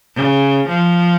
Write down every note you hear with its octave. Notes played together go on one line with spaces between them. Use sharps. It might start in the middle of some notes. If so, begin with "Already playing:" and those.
C#3
F3